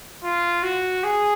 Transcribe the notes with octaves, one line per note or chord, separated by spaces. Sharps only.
F4
F#4
G#4